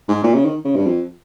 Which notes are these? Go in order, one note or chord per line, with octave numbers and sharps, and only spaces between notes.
G#2
A#2
C#3
D#3
C#3
G2
F2